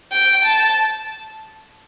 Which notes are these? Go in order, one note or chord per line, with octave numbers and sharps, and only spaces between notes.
G5
A5